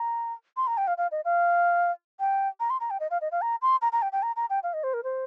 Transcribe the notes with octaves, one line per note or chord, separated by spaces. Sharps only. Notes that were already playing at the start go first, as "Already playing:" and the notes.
Already playing: A#5
C6
A#5
G5
F5
F5
D#5
F5
G5
A#5
C6
A#5
G5
D#5
F5
D#5
F5
A#5
C6
A#5
A#5
G5
G5
A#5
A#5
G5
F5
D#5
C5
A#4
C5